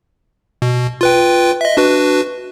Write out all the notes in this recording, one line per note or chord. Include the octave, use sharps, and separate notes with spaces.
B2
F4 B4 G5
D#5 E5
D4 F#4 B4